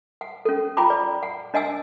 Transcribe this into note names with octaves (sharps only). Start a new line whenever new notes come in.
F#5
C#4 A4
F4 G5 A#5 B5 D6
D5
F#5
D4 D#5 F#5 G#5 E6